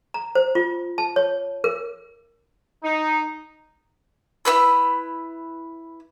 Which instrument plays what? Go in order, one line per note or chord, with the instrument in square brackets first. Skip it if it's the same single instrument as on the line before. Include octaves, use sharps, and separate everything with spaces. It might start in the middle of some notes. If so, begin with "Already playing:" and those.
[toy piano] A#5
C5
F4
A5
C#5
A#4
[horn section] D#4
[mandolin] E4 G#4 B4 E6